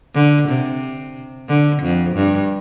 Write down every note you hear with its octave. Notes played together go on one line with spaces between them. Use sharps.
D3
C3
D3
F2
G2